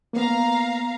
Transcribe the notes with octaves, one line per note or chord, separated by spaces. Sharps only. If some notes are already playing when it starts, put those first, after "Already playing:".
A#3 B3 F5 A#5